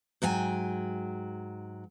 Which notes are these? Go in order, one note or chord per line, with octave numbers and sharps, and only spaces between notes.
G#2 F#3 G5 G#5